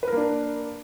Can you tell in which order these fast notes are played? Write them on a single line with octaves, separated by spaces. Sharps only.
B4 A#4 A#3 D4